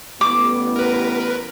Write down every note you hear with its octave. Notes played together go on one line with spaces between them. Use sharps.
A1 G3 B3 D6
A#4 B4